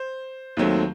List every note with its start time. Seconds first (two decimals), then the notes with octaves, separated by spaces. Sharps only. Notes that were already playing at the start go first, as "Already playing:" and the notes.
Already playing: C5
0.57 D#2 D#3 F#3 A3 C4